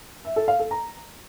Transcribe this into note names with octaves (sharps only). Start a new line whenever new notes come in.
E5
A4
F5
A4
A#5